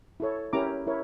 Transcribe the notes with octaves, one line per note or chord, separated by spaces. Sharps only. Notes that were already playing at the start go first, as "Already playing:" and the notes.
E4 A4 C#5
C#4 E4 G4 A#4 A#5 D6
E4 A#4 C#5